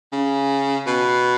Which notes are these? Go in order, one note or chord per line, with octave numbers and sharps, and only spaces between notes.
C#3
B2